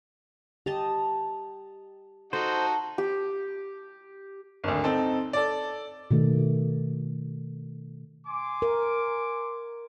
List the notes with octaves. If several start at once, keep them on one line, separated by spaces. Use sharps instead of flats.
G4 D#5 A5 A#5
D#4 F#4 A4 C5
G4
G#1 D2
C4 D#4 A4
A4 D5
B2 D#3 A3
G#5 C6 D6
A#4